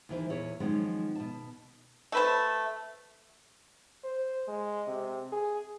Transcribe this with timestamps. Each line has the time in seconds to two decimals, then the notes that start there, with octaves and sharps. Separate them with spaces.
0.09 D#2 E3 C5
0.29 E2 A#2 E4 G#4 C#5
0.60 D#3 F3 F#3 G#3 C4 C#4
1.15 B2 A5
2.12 A3 B4 C5
4.04 C5
4.48 G#3
4.88 C3
5.32 G#4